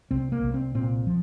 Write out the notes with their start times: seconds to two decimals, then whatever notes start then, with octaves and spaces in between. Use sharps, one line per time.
0.11 C2 C4
0.32 A#3
0.43 C2
0.54 C4
0.75 A#2 C4
1.07 F3